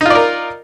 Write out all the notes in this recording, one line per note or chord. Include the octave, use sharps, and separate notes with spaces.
D#4 F4 A#4 D5